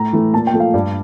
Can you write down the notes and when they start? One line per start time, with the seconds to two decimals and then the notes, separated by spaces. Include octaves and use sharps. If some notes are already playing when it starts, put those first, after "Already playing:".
Already playing: A2 A#5
0.13 E3 A3
0.34 A#2 A5
0.47 G5
0.54 F3 A3
0.60 F5
0.74 G2 D5